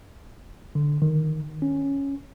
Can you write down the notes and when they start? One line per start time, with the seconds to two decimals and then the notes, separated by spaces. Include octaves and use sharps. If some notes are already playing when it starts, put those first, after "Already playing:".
0.75 D3
1.02 D#3
1.62 C#4